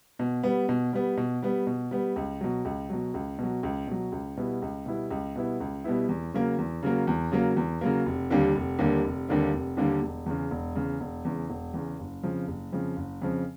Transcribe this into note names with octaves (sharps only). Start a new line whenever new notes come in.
B2
G3 B3
B2
G3 B3
B2
G3 B3
B2
G3 B3
C#2
B2 F#3
C#2
B2 F#3
C#2
B2 F#3
C#2
B2 F#3
C#2
B2 G3 B3 E4
C#2
B2 G3 B3 E4
C#2
B2 G3 B3 E4
C#2
B2 G3 B3 E4
E2
C#3 F#3 A#3
E2
C#3 F#3 A#3
E2
C#3 F#3 A#3
E2
C#3 F#3 A#3
F1
D#2 D3 G3 A#3
F1
D#2 D3 G3 A#3
F1
D#2 D3 G3 A#3
F1
D#2 D3 G3 A#3
E1
E2 C#3
E1
E2 C#3
E1
E2 C#3
E1
E2 C#3
F#1
F2 C#3 F3
F#1
F2 C#3 F3
F#1
F2 C#3 F3